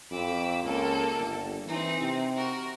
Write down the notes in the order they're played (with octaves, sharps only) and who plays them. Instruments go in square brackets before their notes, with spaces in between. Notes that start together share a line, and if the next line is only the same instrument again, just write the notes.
[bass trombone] F2 [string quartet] B5 D6 E6
[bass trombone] C#2 [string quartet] A#3 A4
[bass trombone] G1
[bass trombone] E3 [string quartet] C4 D#4
[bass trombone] C3
[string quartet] F#4 A#4